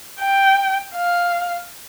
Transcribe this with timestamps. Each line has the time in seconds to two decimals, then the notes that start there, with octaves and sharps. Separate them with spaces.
0.21 G5
0.95 F5